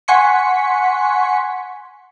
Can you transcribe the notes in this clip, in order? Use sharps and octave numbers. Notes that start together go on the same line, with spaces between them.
F#5 G#5 C6 C#6 B6 C#7